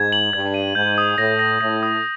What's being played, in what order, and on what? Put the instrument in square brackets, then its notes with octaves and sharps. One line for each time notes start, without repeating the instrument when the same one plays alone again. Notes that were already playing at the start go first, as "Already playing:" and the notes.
Already playing: [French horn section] G#2 [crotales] G#6
[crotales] F#7
[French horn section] G2 [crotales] G#6
[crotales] D#7
[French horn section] G#2 [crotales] G6
[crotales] D#6
[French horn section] A2 [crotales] A#6
[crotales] A#6
[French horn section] A2 [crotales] A#6
[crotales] D#6